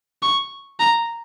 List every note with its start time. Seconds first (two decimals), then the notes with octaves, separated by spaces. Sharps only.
0.23 C#6
0.80 A#5